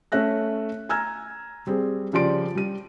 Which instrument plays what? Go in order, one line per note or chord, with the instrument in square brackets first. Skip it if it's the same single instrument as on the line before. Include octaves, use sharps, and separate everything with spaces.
[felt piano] A3 C#4 E5 F#6 A#6
G#5 A#5 E6 F6 G#6
G3 C4 G#4
C#3 F3 G4 D5 C6 D7
G3 D#7